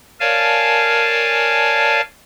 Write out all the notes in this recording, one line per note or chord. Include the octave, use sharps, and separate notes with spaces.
A#4 C#5 D5 F5 G#5 A5